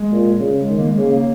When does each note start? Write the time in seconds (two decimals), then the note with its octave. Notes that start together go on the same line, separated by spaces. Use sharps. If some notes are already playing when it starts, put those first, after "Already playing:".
Already playing: G#3
0.12 A#2
0.40 C#3
0.59 G#3
0.69 D#3
0.78 A#3
0.87 G#3
0.98 C#3 A#3